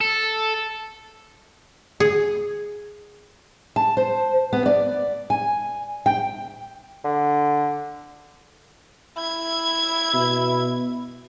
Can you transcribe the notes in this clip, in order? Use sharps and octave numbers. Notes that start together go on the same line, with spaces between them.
A4
G#4
A5
C5
B3
D5
G#5
G5
D3
E4 G#6
B2